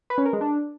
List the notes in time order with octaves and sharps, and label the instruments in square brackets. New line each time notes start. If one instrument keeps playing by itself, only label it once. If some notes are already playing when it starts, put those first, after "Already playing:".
[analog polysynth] B4
C#4
A#4
G#3
D4